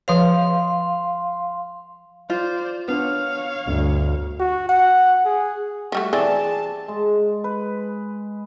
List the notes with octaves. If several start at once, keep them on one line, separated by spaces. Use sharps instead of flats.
F3 B4 C#5 F5 C6
F4 C5 D5
B3 D4 C#5 F5
G1 D2
F#4
F#5
G#4
F3 G3 A3 F#4
E3 C4 G#4 D5 A5
G#3
B4